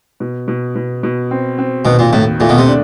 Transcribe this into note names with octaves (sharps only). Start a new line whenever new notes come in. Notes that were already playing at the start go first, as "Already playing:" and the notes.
B2
B2
B2
B2
C4
C4
D#2 B2
A#2
D#2 A2
A#2 A3
B2
C3
D4